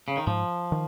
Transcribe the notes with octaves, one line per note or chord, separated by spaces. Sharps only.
C#3
D#3
G#2 F3
D#3